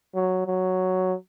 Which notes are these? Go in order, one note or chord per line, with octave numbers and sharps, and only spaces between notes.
F#3
F#3